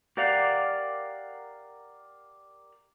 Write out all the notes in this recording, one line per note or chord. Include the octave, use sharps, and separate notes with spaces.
G4 A#4 D5 F5 F#5